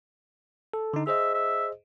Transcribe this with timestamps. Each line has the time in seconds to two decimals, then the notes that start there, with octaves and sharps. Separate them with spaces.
0.74 A4
0.94 D3 D#4
1.07 G#4 C5 D#5 E5
1.34 E5